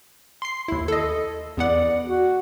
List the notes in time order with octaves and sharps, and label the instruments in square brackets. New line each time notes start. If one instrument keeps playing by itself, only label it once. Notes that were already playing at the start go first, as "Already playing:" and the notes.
[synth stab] C6 C7
D#2 E4
A4 D#5
[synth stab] E2 B3 F#5 [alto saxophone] D5
[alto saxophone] F#4